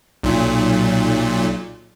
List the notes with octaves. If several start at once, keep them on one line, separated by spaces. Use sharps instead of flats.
B1 A#2